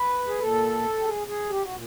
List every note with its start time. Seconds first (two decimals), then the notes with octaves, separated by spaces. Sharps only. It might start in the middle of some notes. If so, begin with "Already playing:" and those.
Already playing: B4
0.27 G#4
0.39 A#2 A4
0.99 G4
1.06 G#4
1.27 G#4
1.50 G4
1.63 F#4
1.71 A#2